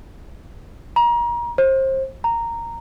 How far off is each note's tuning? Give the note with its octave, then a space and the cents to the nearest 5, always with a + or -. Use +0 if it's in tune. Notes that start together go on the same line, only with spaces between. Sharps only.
A#5 +30
C5 +30
A#5 -10